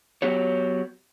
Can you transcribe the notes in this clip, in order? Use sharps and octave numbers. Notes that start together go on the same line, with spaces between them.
F#3 B3 G4 C#5